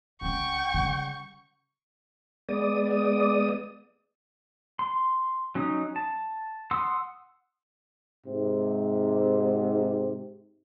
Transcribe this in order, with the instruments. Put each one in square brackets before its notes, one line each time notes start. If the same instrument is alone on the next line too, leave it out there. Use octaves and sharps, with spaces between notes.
[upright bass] C2 C#3 [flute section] F#5 G5 G6 [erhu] C#6
[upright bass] C#3 G3
[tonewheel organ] G#3 B3 D5 D#6
[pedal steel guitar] C6
F#3 C#4 D#4 D#6
A5
F#5 C6 D#6 E6
[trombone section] G#2 C3